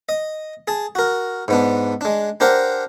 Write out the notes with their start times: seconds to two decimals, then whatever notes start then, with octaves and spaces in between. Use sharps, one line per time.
0.09 D#5
0.68 G#4 A5
0.95 F#4 A#4
1.48 G#2 B3 D4
2.01 G#3 D4
2.40 D4 G4 A#4 C5 F#5 A#5